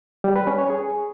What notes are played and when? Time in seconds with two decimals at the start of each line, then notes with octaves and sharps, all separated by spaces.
0.24 G3
0.36 B4
0.47 C#4
0.58 C#5
0.70 G#4